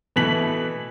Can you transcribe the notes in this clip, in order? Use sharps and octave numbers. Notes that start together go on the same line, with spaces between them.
B2 E3 A3 B6 F#7